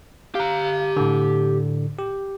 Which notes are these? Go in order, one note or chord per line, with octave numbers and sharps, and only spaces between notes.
G4 F5 A#5
A2 D3
G4